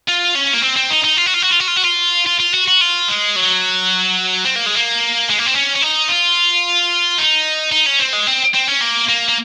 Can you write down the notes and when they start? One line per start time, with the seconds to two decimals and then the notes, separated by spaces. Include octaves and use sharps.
0.09 F4
0.36 C#4
0.54 A#3
0.63 C4
0.77 C4
0.91 D#4
1.04 D#4
1.17 F4
1.26 F#4
1.34 F4
1.42 F#4
1.51 F4
1.60 F#4
1.68 F4
1.76 F#4
1.84 F4
2.27 F4
2.40 F4
2.54 F#4
2.68 F#4
2.81 F4
3.08 G#3
3.36 F#3
4.45 C4
4.56 A#3
4.66 G#3
4.76 A#3
5.29 G#3
5.38 A#3
5.46 C4
5.54 C#4
5.76 C#4
5.82 D#4
6.08 F4
7.18 D#4
7.72 D#4
7.86 C#4
8.00 C4
8.13 G#3
8.27 C4
8.55 C4
8.68 C#4
8.81 A#3
9.09 A#3
9.28 A#3